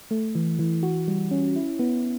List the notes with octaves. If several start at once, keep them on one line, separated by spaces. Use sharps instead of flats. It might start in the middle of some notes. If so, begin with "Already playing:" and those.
A3
E3
E3
F#4
G3
C#4
E4
B3